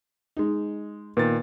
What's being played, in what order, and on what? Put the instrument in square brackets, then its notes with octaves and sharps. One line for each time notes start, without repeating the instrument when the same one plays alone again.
[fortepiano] G#3 D#4
[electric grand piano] A#2 D#3 A6 [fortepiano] B3